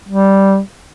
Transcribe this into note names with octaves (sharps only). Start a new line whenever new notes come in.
G3